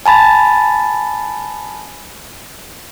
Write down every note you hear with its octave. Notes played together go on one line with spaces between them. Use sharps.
G#5 A5 B5 A6